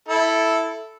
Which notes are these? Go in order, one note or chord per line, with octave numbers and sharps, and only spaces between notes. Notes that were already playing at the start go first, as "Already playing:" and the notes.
E4 A4